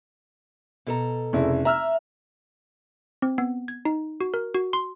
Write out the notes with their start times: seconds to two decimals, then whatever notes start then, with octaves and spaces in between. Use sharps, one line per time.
0.86 B2 A4 A#5
1.33 F1 C#3 E4
1.65 E5 A#5 E6 F6
3.22 C4
3.38 B3
3.68 G#6
3.85 D#4
4.21 F#4
4.34 A#4
4.54 F#4
4.73 C6